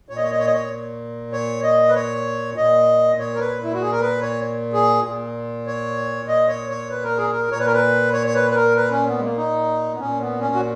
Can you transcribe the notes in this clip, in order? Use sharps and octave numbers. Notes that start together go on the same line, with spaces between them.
A#2 C#5
D#5
C#5
D#5
C#5
D#5
C#5
C#5
D#5
B4
C#5
A#2 D#5
C#5
A#4
B4
E4
F#4
G#4
A#4
B4
C#5
G#4
A#2
C#5
D#5
C#5
C#5
B4
A#4
G#4
A#4
A#2 C#5
B4
A#4
B4
C#5
C#5
B4
B4
A#4
B4
C#4
B3
G#3
A#3
D#4
B3
A#2 C#4
B3
C#4
F#4